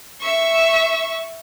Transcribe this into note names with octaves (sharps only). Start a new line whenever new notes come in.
E5 C#6